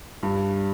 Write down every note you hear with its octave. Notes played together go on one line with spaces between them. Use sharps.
G2